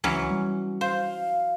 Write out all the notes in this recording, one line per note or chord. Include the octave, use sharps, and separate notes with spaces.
C#2 E3 F#3 C#4
G3
C5 F5